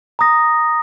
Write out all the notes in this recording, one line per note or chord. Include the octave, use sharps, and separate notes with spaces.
A#5 D#6 A#6